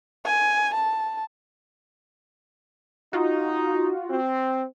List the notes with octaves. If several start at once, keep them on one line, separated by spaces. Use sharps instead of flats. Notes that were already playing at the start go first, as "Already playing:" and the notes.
G#5
A5
D#4 F4 F#4
C4